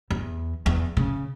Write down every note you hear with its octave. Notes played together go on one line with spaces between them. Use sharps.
E2
E2
C#3